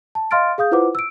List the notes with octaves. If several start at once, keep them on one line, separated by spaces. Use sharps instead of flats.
A5
D#5 F5 C6 F6 A6 D7
G#4 F5 D#6 G6
E4 F4 B4 C5 F#5 D6
E6 D7